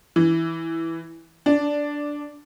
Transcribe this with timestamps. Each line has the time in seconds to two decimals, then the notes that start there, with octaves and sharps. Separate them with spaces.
0.16 E3
1.46 D4